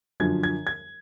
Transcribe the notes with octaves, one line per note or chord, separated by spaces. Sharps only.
F#2 D3 F3 G#6
G#6
G#6